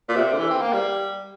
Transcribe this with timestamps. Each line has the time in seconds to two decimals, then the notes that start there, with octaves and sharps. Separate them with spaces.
0.09 A#2
0.16 C3
0.33 D3
0.39 E3
0.50 C4
0.62 A#3
0.73 G3